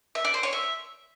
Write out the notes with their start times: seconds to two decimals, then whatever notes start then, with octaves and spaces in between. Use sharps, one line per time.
0.15 E5
0.25 D5
0.34 C5
0.43 C#5
0.53 E5